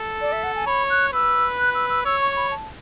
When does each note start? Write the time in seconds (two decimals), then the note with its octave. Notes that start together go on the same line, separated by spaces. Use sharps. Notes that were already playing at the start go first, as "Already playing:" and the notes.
Already playing: A4
0.21 D5
0.32 E5
0.44 F#5
0.56 G#5
0.67 C#5 B5
0.90 F#6
1.13 B4 E6
1.59 F#6
1.75 E6
1.90 E6
2.05 C#5 E6
2.21 C#6
2.36 B5
2.51 A5